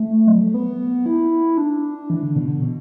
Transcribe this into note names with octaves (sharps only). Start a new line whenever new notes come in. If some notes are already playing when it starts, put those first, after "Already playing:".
Already playing: A3
F#3
A3
B3
E4
D4
E3
D3
B2
D3
B2